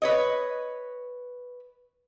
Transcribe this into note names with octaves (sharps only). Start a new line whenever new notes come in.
B4 C#5 D#5